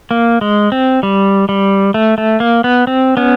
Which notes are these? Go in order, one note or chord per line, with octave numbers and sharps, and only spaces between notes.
A#3
G#3
C4
G3
G3
A3
A3
A#3
B3
C4
B3 C#4